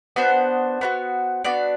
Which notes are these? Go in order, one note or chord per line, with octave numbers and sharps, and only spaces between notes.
B3 D4 F#4 C5
B3 D4 F#4
B3 D4 F#4 D5